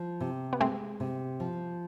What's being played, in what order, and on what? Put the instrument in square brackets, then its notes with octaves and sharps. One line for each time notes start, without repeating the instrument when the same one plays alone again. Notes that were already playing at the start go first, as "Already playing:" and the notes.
Already playing: [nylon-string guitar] F3
C3
[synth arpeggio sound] B3
[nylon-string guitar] G#3 [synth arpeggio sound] A3 C4
[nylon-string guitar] C3
F3